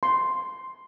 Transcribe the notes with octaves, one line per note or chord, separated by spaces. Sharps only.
C6